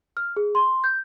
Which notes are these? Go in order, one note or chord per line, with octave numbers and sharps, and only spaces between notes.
F6
G#4
C6
G6